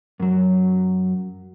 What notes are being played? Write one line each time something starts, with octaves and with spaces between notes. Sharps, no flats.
F#2 F#3